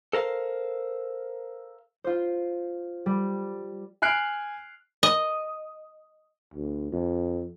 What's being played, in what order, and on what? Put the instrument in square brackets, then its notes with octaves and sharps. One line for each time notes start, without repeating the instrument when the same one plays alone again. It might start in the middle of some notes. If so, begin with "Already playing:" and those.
[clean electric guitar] A4 A#4 C5 F5
[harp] F4 C5
G3
[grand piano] G#5 F6 F#6 C7 D7
[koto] D#5
[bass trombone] D2
F2